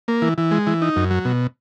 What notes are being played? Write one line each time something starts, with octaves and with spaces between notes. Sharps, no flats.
A#3
E3
E3
G#3
E3
D#4
F#2
F#3
B2